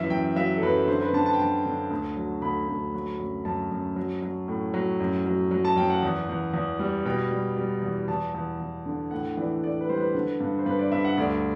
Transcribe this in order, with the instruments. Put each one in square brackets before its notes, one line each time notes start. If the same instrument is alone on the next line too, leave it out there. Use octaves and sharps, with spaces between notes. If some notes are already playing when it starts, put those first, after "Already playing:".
Already playing: [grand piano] F#2 E3 E5
F#2 G5
F#3 E5
A4
F#2 B4
D3 C5
B4
D3 A5
A5
G5
D3 A5
D3
D2
F#3
D2 B5
D2
F#3
F#2
F#2 A5
F#2
F#3
F#3
A2
F#3
F#2
F#3
F#3
A5
F#2 G5
F#5
E2
E2
E2
G3
B2 G5
G3
G3
E2
E2 A5
E2
E2
D3
A2 F#5
E3 D5
A2 D5
B4
G3 C5
B4
D3
G2
C5
G2 B4
D5
G2 E5
F#5
D2 D5